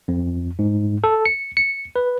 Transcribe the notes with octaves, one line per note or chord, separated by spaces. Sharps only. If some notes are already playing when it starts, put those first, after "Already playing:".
F2
G#2
A4
C#7
C#7
B4